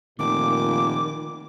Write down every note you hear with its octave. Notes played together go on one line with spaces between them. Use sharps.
F1 A#2 D#3 D6